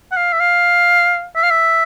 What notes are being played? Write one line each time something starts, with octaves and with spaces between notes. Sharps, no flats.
F#5
F5
E5
F5
E5
F5
E5